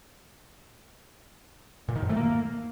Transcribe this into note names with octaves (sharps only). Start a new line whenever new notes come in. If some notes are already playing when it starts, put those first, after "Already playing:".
A#2
D#3
F#2
A3
A#3